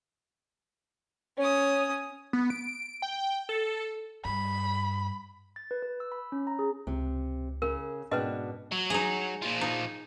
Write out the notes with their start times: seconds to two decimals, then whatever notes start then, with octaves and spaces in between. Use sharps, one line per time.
1.38 C#4 C#5 D#6
2.33 B3
2.50 D7
3.02 G5
3.49 A4
4.25 G2 B5
5.56 A6
5.71 B4
5.83 B4
6.00 E6
6.12 B5
6.32 C#4
6.47 A#5
6.59 G#4
6.87 C#2 C3
7.62 C#3 A#4
8.11 G#2 B2 C#4 D4 B4 D#5
8.71 F#3
8.90 D#4 G#4
9.42 A#2 F3
9.61 D#4